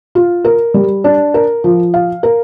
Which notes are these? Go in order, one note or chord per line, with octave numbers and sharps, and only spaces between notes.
F4
A#4
G3
D4
A#4
F3
F5
A#4